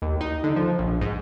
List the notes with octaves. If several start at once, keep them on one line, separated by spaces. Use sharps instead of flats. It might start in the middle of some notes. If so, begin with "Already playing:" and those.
D#2
D#4
D3
F3
A#1
G#2